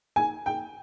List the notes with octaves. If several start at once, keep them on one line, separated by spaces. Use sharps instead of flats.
G#5
G5